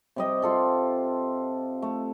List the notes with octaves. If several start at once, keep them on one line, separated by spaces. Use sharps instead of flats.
C3 G3 D#5
F4 A4 D5
A3